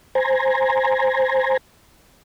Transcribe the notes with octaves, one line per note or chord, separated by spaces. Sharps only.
C5 G#5 A#5